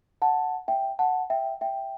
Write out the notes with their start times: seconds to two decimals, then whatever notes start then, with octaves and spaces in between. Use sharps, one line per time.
0.22 F#5 A5
0.68 E5 G5
0.99 F#5 A5
1.30 E5 G5
1.61 E5 G5